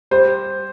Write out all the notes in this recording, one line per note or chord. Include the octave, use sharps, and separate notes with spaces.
G3 C5